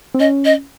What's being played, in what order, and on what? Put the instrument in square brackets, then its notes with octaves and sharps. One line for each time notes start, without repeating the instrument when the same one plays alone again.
[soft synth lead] C4
[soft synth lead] C#4 [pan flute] D#5
[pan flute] D#5